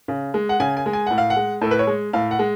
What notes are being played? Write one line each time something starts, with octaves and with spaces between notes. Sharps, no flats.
C#3
G#3
F#5
C#3 G#5
G#5
G#3
G#5
A2 F#5
F5
F#5
G#3
A2 A4
B4
C#5
G#3
A2 F5
F#5
G#3